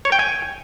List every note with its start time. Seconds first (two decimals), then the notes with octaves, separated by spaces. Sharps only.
0.05 C#5
0.12 G5
0.19 G#5